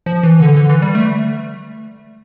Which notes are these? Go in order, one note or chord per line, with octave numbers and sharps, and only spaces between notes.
F3
E3
D3
D3
E3
G3
A3